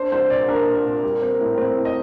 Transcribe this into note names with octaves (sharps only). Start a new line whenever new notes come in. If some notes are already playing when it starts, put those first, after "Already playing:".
Already playing: D4 C5
C2 C5
A#2 D5
D4 A#4
A#2
A#2
G3
C4
A2
C4
A2
D#5